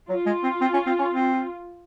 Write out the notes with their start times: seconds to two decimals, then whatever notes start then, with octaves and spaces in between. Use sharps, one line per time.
0.09 F#3 F4
0.26 G#3
0.43 C4
0.61 C4
0.73 C#4
0.86 C4
0.99 C#4
1.12 C4